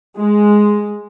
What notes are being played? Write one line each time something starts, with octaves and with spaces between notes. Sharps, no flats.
G#3